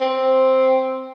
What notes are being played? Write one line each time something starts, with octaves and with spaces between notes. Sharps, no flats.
C4